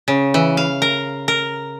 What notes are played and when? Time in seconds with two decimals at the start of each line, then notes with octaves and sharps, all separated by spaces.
0.08 C#3
0.34 E3
0.57 F5
0.82 A#4
1.28 A#4